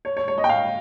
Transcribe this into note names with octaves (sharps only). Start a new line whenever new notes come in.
C#5
C#5
C#5
D#5
G5
F5